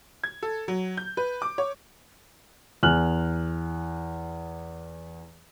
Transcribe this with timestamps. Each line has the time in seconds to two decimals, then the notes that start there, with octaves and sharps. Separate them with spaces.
0.24 G#6
0.43 A4
0.68 F#3
0.97 G6
1.17 B4
1.42 D6
1.58 C#5
2.83 E2 G#5 F6 F#6 F#7